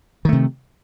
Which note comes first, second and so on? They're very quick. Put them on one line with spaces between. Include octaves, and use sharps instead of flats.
D#3 A3 C3